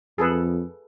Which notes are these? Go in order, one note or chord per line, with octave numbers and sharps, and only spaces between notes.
F2 G#4 A4 B4